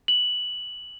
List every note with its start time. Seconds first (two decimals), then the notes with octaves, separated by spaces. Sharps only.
0.08 F#7